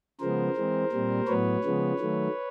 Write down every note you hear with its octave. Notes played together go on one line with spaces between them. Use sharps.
C#3 F3 G#3 B3 A#4 C5
E3 G#3 C4
A#2 G3 C4
A2 F#3 B3 B4 C#5
C#3 F3 G#3 B3
D#3 F#3 A3